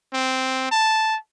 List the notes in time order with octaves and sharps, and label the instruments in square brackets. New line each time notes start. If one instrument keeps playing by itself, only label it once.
[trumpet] C4
A5